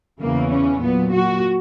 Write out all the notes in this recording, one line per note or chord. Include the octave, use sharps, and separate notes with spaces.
E2 C#3 E3 A#3
C#4
A#2 F#3 B3
F#4